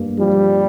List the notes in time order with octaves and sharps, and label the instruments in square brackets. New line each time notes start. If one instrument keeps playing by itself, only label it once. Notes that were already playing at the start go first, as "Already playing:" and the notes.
Already playing: [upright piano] G2 A#3
[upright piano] F3 [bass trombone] G3